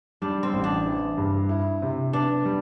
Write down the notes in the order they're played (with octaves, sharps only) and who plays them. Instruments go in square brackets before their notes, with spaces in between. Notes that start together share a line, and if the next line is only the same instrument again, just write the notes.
[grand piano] G3 [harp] D4
[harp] C4
[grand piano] A1
[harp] D4
[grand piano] E3
G2
E4
C3
[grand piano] B3 [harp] D4
[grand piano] G3